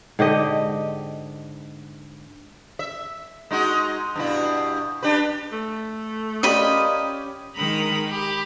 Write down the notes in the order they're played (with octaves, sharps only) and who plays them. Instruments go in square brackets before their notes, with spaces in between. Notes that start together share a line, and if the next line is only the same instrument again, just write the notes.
[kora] G#2 D3 G4 D#5
[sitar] E5
G#3 D#4 F#4
G2 B2 E4
D4 G4 B4
[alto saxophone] A3
[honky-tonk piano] C#4 G4 D5 [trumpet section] F4 A#4 D#6 [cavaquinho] D#5 B5
[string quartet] D#3 G#3 A#5 B5 D#6
G4 B5